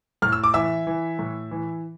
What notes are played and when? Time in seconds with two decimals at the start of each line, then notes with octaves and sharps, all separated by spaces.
0.22 A2 F6
0.32 E6
0.44 D6
0.54 E3 E5 E6
0.87 E3
1.19 A2
1.51 E3